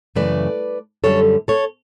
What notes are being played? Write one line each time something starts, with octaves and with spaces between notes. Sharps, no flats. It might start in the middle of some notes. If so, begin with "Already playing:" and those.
F#2 C#3 E3 A3 B4 D5
F#2 D3 G3 A4 C#5
A4 C#5